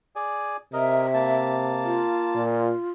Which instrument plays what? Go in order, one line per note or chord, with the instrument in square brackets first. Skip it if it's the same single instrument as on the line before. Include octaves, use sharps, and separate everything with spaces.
[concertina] G#4 D5 G#5
[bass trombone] C3 [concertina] A#4 D#5 [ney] E5
[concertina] A#3 A5
[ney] F4
[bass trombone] A#2